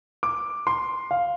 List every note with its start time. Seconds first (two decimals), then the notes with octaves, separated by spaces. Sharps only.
0.23 D6
0.67 C6
1.11 F5